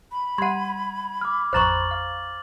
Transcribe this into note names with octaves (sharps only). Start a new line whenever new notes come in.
B5
G3 F#5 C6 G#6 D#7
D6 F6
A1 F2 C5 A#5 C#6 F6 A6 F#7
F5